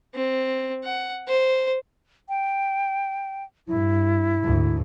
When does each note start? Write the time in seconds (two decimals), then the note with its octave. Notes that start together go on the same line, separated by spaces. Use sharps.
0.15 C4
0.84 F#5
1.27 C5
2.29 G5
3.68 G2 E4
4.41 D2 G#2